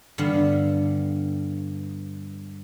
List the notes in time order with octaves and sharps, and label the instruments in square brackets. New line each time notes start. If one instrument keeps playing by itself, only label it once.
[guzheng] G2 D3 B3 F5 B5